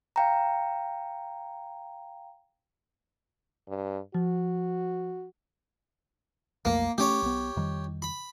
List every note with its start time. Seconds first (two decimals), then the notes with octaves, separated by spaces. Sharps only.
0.16 F5 G5 A#5
3.68 G2
4.15 F3 F#4
6.65 B1 F2 A3 A#3
6.98 A3 C#4 G4 C#5
7.22 B1 B3
7.56 F2 D#3 G3
8.02 B5